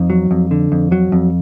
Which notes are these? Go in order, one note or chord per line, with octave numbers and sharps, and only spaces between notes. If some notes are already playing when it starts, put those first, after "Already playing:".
Already playing: F2 D#4
F#3
F2
D3
F2
F#3
F2